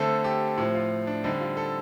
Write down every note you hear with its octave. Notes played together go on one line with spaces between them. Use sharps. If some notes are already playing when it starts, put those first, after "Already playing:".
Already playing: D3 A3 C4 A4
G4
A2 F3 C4
F4
D4
D3 G3 C4 D#4
F4
A4